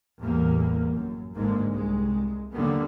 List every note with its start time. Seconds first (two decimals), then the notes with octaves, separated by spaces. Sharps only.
0.20 A1 E2 G3 A#3
0.91 F#2
1.36 G#1 D2 G#2 D3 G#3 A#3
1.69 C2 G#3
2.53 D#2 D3 F#3 G3 A#3 B3